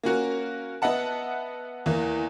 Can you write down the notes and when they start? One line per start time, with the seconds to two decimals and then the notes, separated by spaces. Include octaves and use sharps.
0.04 A#3 C#4 F#4 A#4
0.82 B3 D#5 E5 F#5 A5
1.86 E2 E3 A#3